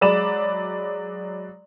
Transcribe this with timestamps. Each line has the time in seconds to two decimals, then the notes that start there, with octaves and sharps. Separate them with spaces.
0.01 F#3 G#3 D5 B5 E7